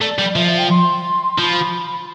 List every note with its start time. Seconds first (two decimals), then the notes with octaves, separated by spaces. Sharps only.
0.01 A3 D5
0.19 G3
0.35 F3 E5
0.47 E5
0.58 G5
0.70 C6
1.38 F3 B5 C6